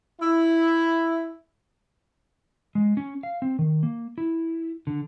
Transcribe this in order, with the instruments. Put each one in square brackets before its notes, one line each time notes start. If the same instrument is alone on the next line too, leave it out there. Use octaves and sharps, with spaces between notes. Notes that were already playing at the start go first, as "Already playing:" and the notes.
[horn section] E4
[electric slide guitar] G#3
C#4
F5
C4
D#3
A#3
E4
D3